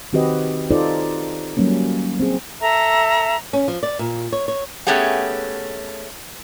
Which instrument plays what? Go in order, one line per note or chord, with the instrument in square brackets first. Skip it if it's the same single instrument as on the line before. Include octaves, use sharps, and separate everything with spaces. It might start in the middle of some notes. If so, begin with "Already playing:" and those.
[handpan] D#3 C4 F#4 G4 B4 D#5
D#4 F4 A4 C5 D5
F#3 G3 A#3 C#4
C4 G#4
[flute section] A4 E5 A#5
[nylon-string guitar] C#4
F3
D5
A#2
C#5
C#5
[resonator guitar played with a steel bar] A3 B3 C#4 G4 G#4 F#5